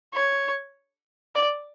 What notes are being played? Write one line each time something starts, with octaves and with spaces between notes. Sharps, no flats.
C#5
D5